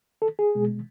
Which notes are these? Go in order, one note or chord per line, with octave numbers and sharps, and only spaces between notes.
A4
G#4
B2 G#3